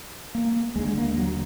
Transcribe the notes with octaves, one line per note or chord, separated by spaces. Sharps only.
A#3
D#2 D3 G#3
A#3
F#3